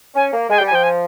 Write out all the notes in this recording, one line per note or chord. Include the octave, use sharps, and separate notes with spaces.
C#4 G#5
A#3
G#3 G#5
G3 G5
G#5
F3 G5
G#5